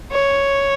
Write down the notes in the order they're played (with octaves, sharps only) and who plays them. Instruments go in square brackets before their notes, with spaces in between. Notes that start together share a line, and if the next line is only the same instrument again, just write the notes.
[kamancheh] C#5